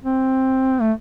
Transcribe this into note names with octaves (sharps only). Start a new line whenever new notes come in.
C4
A3